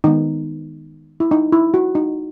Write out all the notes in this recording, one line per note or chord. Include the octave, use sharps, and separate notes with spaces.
D#3 G#3 B3 D#4
E4
D#4
E4
F#4
D#4